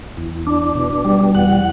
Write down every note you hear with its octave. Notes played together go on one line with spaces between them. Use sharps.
E2
D4
B2
G3
E2 F#5